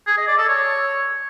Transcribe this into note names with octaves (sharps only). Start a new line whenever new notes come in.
G#4
D#5
D5
A4
C#5